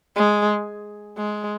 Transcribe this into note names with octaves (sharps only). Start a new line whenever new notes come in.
G#3
G#3